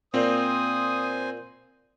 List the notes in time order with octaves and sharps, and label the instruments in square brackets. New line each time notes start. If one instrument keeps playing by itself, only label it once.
[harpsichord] A#2 [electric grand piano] C4 [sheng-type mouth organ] C5 G#5 [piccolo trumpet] D#6